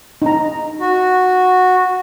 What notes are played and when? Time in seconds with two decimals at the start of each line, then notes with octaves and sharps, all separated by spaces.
0.22 D#4 A#5
0.80 F#4